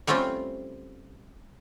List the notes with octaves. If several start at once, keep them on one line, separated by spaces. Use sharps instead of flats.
G3 A3 C4 C#4 F4 G4